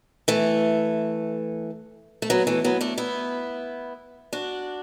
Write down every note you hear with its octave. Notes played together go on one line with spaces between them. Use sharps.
E3 A3
A3
F#3 B3
E3 A3
F#3 B3
A3 D4
B3 E4
D4 F#4